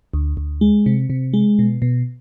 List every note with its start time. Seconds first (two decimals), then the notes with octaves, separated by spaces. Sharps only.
0.14 D2
0.37 D2
0.61 G#3
0.86 C3
1.10 C3
1.34 G#3
1.59 B2
1.82 B2